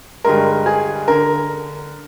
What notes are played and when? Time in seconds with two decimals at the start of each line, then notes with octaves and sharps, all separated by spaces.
0.25 G2 D3 G#3 A#4
0.66 G#4
1.08 D3 A#4